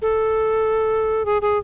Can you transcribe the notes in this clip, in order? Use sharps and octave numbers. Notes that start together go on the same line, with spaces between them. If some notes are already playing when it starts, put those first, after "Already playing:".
A4
G#4
G#4